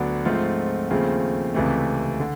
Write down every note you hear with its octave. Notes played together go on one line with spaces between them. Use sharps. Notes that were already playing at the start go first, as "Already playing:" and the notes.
Already playing: D2 D3 F#3 B3 D4
G#2 F3 A3 C4 F4
D#2 C#3 F3 A3 C4
C#2 C3 E3 A3
D3